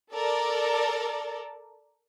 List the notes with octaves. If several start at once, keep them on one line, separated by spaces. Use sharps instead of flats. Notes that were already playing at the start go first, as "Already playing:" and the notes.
A4 A#4 D5